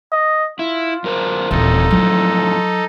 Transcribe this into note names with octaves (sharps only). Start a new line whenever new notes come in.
D#5
E4 F4
F#2 A#4 C5
D#1 A#2 E3 C4 D#4 A4
F2 A2 F#3